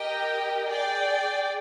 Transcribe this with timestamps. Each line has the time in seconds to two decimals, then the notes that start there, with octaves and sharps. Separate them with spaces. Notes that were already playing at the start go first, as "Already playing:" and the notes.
Already playing: G4 A#4 D#5 G5
0.68 G#4 D5 G5